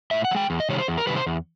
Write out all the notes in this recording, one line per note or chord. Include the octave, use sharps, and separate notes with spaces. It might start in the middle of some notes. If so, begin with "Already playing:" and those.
A2 E5
F#5
F3
G#3 G5
E2
D#5
C3 D#3 G3 C#5
C5
E2
A#4
C3 D#3 G3 B4
C5
E2